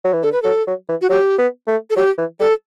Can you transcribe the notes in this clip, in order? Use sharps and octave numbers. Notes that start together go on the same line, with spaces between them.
F#3
E3
D3 A4
B4
F#3 A4
F#3
E3
F#4
F#3 G4
B3
A3
A4
F#3 G4
E3
G3 A4